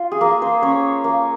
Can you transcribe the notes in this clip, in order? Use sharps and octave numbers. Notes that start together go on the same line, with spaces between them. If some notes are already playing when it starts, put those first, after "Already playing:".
Already playing: F4
G#4
A#3 A#4
C5
C#4 C#5
A#3